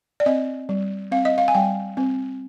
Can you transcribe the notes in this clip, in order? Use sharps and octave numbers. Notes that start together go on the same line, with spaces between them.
D5
C4 D#5
G3
C4 F5
D#5
F5
G#5
G3 G5
C4